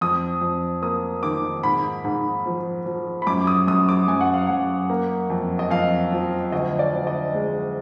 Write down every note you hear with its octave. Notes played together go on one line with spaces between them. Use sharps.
F2 D#6
F2
A#3 D#6
D#3 D6
G#2 B5
G#2
F3
F3
B5
F#2 D6
D#6
F#2 D#6
D6
F#2 G#5
F#5
F5
F#2 F#5
A#3
F2
D#5
F2 F5
F3
D2 D#5
D5
D2
D#5
G#3